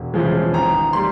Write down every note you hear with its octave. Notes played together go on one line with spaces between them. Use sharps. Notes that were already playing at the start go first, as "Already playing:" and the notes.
Already playing: E1
E2 C#3 F3 G#3
G#1 A#5
G3 C6